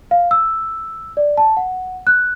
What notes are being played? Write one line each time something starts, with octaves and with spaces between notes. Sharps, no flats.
F5
E6
D5
A5
F#5
F#6